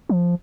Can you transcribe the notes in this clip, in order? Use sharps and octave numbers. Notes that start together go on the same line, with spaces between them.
F3